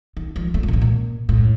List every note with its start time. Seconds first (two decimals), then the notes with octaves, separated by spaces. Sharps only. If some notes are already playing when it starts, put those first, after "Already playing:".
0.17 D#3
0.36 F3
0.54 A3
0.63 F3
0.68 A#2
0.73 A2
0.82 A#2
1.29 A2